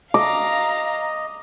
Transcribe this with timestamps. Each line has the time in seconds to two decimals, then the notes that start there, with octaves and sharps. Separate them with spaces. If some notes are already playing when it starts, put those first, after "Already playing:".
0.14 D#5 F5 A#5 D6